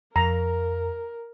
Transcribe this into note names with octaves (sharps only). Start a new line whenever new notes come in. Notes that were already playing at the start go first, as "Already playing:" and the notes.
F2 A#4 A#5